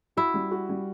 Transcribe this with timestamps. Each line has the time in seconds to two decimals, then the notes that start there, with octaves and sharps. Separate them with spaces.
0.17 E4 F#4
0.34 G3
0.51 F#4
0.69 G3